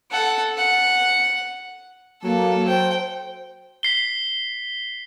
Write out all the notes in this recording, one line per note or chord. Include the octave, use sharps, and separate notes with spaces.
A4 F#5
F#5
F#3 A#3 A4
C5 G5
B6 C7 G7